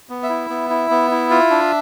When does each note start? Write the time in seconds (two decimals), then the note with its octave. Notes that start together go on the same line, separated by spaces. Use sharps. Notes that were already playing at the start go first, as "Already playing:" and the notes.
0.09 B3
0.23 E5
0.29 E4
0.50 B3
0.70 E4
0.90 B3
1.11 E4
1.31 F4
1.50 D4